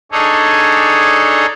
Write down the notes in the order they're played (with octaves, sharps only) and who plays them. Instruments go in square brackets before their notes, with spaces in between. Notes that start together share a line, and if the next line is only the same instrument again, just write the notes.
[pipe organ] D4 D#4 G#4 A4 C#5